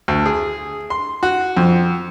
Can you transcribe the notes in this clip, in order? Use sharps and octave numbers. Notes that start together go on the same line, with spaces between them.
D2
G#4
C6
F#4
F2